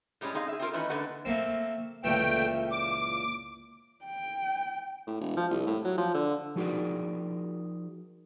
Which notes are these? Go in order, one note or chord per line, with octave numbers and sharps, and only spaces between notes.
A2 G3 G#3 C#4
C4 D#4 G#4 F5
G#4 E5
C4 C#4 F4 A#4
D#3 E3 A3 C#4 D#4 B4
D3 A3 A#3 B4 F#5
A3 A#3 C4
C#2 A#2 E3 A3 G5
D6
G5
A2
E1
F3
C2
A2
F#3
F3
D3
F3 D#4 F#4 G#4 A#4 D5